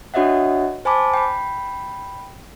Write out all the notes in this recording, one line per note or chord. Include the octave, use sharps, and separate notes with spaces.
D4 F#4 C#5 D#5 E5 F#5
C5 G#5 A5 B5 D6
G5 B5